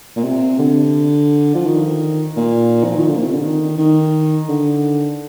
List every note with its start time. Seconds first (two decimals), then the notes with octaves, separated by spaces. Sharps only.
0.16 A#2
0.24 C3
0.59 D3
1.55 F3
1.66 D#3
2.37 A#2
2.84 F3
2.96 D#3
3.08 D3
3.17 A#2
3.25 C3
3.34 D3
3.43 D#3
3.78 D#3
4.49 D3